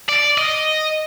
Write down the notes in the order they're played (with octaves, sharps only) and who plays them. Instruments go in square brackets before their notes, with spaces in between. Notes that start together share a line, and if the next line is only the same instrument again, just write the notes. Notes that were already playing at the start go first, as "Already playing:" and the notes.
[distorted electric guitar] D5
D#5